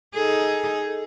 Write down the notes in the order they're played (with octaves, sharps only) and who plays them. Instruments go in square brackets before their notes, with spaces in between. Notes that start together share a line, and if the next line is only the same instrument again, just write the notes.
[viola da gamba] D#4 G#4 [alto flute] A4